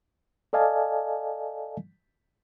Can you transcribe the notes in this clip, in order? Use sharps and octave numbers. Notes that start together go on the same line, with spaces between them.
A4 D5 D#5 F5 G#5 A5